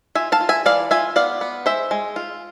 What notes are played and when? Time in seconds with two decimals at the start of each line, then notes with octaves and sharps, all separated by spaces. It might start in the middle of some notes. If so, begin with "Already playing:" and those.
0.15 F4 E5 G#5
0.32 F5 A5
0.41 F4
0.49 E5 G#5
0.66 E3 D5 F5
0.91 F4 E5 G#5
1.16 B3 D5 F5
1.41 B3
1.66 G#3 C5 E5
1.91 G#3
2.16 F4